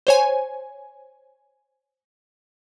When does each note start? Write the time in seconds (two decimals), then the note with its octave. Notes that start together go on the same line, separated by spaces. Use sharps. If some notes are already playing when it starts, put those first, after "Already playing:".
0.07 C5 C#5 G#5